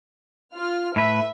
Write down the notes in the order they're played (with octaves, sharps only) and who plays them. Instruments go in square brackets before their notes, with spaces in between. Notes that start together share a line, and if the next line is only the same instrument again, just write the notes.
[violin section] F4 F6
[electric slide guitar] A2 B4 [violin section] E5